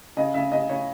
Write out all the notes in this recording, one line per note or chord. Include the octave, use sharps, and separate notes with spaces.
C#3 D#5
C#3 E5
C#3 D#5
C#3 C#5